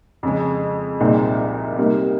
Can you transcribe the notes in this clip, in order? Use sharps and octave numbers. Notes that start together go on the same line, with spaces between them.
F2 C#3 G#3
C2 A#2 G#3 C4 D#4
C3 G3 A#3 D#4